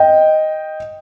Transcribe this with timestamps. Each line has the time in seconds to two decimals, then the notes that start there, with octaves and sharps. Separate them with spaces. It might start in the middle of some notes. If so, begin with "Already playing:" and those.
Already playing: D#5 G5